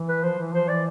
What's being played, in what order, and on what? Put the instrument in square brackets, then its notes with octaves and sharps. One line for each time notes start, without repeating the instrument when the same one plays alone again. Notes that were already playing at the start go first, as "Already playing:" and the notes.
Already playing: [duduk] E3
[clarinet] B4
[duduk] F3 [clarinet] C5
[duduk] E3
[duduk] F3 [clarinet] C5
[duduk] E3 [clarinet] D5